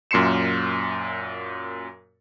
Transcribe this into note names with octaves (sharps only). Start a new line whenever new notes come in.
F#2 A#2 C6 C7 C#7 E7